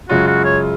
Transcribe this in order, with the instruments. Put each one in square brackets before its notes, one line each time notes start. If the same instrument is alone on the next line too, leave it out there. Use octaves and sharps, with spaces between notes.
[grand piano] F#2 C#3 G#3 C#4 F4 [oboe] F#4
[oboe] F#4
C#5